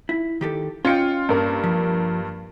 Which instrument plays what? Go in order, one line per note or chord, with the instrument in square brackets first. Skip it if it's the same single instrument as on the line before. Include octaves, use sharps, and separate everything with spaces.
[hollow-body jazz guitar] E4
D#3 G4 A4
[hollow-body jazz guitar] C#4 D#5 G5 [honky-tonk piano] F4 C#7
[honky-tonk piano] G2 A#3
[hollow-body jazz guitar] F3